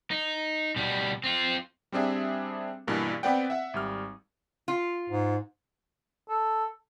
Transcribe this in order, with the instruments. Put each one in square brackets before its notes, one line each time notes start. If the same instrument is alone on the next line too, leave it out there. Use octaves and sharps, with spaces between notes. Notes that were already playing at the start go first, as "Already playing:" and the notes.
[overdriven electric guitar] D#4
B2 G3
C4 F4
[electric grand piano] G3 C4 D4 G#4 E5
G2 B2 E3 A#3
B3 C4 B4 D5 F#5 G5
E5 F#5
G#1 G3 F6
[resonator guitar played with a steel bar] F4
[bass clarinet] G#2
[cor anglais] A4